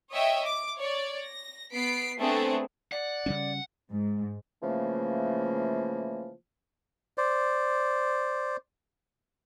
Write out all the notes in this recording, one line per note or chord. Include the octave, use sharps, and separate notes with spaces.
C#5 D#5 E5 G5
D6
C#5 D5
A#6
B3 B6 C7 D7
A3 B3 C4 D4 G#4 A4
D5 F#5
C#3 G3 C#4
G#2
C#3 E3 F3 A3 A#3
C5 D5